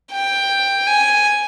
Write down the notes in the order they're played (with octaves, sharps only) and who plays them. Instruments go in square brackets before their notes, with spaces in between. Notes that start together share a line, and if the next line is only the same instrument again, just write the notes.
[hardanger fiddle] G5
G#5